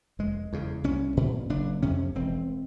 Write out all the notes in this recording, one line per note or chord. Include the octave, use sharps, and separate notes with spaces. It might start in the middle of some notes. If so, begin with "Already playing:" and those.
F1 G#3
E2 C#3
C2 C#4
A#2
F#1 D4
F2 C3 C#4
E1 C4